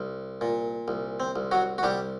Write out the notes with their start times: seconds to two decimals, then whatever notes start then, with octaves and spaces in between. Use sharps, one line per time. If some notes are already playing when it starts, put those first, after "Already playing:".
Already playing: C2
0.41 A#2
0.88 C2
1.20 C4
1.36 C2
1.51 F#3 F#4
1.78 F#4
1.83 C2 G3 G4